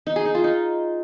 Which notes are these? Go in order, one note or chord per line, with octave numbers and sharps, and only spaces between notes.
D#4
G#4
D#4
F4
D#4